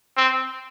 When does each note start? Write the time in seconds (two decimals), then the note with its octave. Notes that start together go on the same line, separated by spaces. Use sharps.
0.17 C4